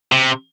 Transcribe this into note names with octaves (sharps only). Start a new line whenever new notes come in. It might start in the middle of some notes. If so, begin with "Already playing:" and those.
C3